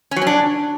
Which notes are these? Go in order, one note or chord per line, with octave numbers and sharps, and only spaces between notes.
C#4
F#3
C#4
D4